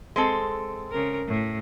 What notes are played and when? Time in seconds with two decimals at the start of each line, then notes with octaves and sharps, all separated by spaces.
0.16 G#3 C4 A4
0.90 C#3 A#4
1.27 A2